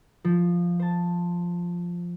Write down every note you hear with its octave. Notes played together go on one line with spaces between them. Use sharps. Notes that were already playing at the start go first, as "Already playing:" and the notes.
F3
C5 A5